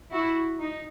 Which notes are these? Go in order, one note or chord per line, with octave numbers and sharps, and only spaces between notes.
E4 F#4
D#4